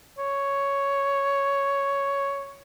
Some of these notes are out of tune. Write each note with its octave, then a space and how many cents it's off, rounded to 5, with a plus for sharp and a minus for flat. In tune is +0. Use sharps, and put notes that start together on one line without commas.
C#5 +5